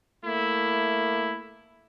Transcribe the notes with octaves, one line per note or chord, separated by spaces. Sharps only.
A3 A#3 E4